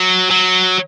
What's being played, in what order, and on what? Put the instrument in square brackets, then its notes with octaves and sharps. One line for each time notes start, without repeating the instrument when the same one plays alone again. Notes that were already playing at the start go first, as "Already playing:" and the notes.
Already playing: [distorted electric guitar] F#3
F#3